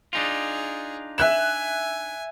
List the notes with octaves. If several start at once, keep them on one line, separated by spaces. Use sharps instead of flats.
D4 D#4 F4 G#4
E5 G#5 F#6 E7